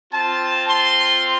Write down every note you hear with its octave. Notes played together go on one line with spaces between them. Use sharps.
C4 F4 A5
C6